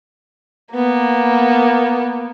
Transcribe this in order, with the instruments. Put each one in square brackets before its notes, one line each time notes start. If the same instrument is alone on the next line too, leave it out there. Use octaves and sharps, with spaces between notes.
[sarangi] A#3 [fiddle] B3